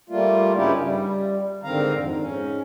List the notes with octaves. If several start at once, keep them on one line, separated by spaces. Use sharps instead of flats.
G3 A3 A#3 F4
G2 C#3 C#4 D#4 E4 G4
G3
G#2 D3 D#3 C4 F5 A#5
F2
G#2 C#4